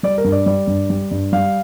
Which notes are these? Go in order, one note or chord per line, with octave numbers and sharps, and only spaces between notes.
G3 D5
A#4
G2
D5
G3 D5
G2
G3
G2
G3 F5